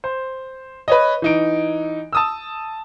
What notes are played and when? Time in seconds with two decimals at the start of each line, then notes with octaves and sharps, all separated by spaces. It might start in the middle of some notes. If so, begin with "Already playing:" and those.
0.04 C5
0.88 B4 C#5 D#5
1.22 E3 D#4 D7
2.13 A5 D#6 E6